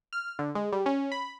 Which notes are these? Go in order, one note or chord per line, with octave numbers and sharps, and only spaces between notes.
F6
D3
G#3
G3
C#4
B5